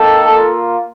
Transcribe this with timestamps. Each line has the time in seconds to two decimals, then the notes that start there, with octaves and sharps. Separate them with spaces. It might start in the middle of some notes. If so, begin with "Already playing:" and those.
Already playing: A#3 D#4 G4 A4
0.31 A#3 F4